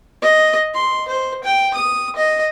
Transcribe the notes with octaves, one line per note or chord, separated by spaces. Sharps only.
D#5
C6
C5
G5
D#6
D#5